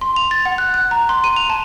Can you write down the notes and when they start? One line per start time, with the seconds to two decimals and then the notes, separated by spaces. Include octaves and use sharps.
0.01 C6
0.16 F7
0.31 A6
0.45 F#5
0.58 F#6
0.74 F#6
0.91 A#5
1.09 C6
1.24 D#7
1.36 F7
1.50 A5